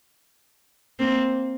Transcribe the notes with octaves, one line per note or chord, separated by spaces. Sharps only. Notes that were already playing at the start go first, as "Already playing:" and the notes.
A#3 C4